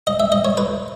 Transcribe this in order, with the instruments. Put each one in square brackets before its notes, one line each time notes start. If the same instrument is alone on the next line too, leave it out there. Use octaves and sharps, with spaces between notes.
[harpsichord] D#5
E5
D#5
C#5
B4